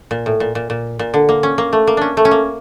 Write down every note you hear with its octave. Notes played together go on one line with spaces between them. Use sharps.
A#2
A2
A#2
A#2
A#2
A#2
D3
A#3
C#4
A#3
A3
A#3
C#4 D4
A3
C#4
A#3